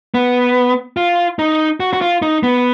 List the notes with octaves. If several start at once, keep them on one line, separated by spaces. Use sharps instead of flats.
B3
F4
D#4
F#4
F#4
F4
D#4
B3